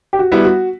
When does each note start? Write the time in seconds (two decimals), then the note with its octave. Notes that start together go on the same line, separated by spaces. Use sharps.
0.13 G4
0.19 F#4
0.32 G3 B3 E4
0.44 F#4